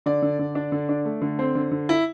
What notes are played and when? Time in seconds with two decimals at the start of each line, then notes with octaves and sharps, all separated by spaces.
0.06 D3 D5
0.22 D3
0.39 D3
0.55 D4
0.72 D3
0.89 D4
1.05 A3
1.22 D3
1.39 C4 C5
1.55 D3
1.71 D3
1.89 E4